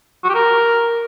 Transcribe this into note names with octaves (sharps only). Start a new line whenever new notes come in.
F#4
G4
A#4